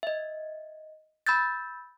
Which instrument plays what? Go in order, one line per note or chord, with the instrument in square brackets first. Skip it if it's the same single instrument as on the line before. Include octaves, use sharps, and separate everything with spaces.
[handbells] D#5 E5
B5 E6 G6 A6